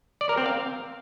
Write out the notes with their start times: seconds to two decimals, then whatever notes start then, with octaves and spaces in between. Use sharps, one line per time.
0.21 D5
0.29 A#4
0.37 C4
0.46 F5